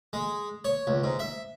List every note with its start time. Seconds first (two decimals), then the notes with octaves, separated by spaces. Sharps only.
0.13 G#3
0.65 C#5
0.87 C#2
1.04 G#2
1.19 E5